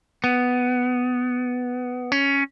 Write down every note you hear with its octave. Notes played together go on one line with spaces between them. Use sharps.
B3
C#4